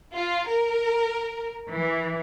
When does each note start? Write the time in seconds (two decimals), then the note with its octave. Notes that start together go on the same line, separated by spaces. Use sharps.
0.14 F4
0.48 A#4
1.71 E3